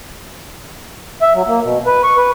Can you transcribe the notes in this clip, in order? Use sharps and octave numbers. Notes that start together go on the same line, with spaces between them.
E5
F#3
A#3
B2
B4
C#6
B4